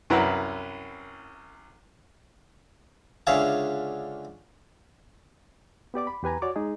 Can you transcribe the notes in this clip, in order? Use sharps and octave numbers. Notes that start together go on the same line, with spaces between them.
C2 F#2 E4 B4 F#5 A#5
C#2 D3 C#4 G#4 E5 F5
B3 G4 D5 D6
B5
E2 G4 B4 G#5 A#5
F#4 C#5 D5 D6
G#3 D#4 G#4